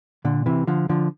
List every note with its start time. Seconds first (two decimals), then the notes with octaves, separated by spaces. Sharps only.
0.25 A#2 D3
0.46 C3 E3
0.67 D3 F3
0.89 D3 F3